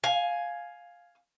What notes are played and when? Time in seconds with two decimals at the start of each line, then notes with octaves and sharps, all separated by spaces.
0.04 F5 G#5